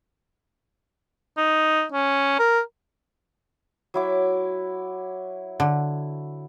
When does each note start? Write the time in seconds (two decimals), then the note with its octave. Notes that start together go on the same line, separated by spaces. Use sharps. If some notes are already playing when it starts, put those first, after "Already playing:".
1.38 D#4
1.92 C#4
2.39 A#4
3.94 F#3 E4 D6
5.60 D3